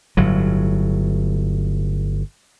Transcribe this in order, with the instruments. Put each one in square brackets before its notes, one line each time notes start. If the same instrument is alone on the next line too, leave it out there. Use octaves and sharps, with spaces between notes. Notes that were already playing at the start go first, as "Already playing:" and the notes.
[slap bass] G1 A2 F#3